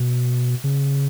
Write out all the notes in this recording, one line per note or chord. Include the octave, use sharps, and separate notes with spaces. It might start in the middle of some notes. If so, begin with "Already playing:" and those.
Already playing: B2
C#3